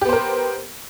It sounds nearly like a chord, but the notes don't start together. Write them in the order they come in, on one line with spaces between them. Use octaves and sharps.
G4 B3 C5 A#4